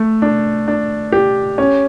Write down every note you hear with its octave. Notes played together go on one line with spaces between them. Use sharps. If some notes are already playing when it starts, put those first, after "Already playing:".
Already playing: A3
D4
D4
G4
C#4